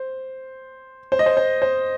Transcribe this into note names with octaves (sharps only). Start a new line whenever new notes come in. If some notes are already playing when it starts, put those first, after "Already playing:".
Already playing: C5
C5
D#5
C5
C5
C5